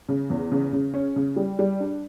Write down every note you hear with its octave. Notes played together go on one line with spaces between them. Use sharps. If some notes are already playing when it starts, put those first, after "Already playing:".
C#3
E2
C#3
C#3
C#4
C#3
G3
G3
D4